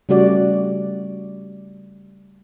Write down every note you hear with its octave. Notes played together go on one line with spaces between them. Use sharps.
C#3 G3 A3 F#4 D5